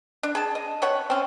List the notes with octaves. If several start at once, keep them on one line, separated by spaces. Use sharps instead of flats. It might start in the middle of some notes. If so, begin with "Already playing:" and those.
D4
G#4 A5
D#5
C3 C#5 F#5
C4 C#4